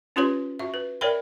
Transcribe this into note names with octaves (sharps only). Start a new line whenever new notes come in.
C#4 F4 G4 B4 C#5 C6
F#4 E5
B4
A#4 C#5 D5 E5 G5 B5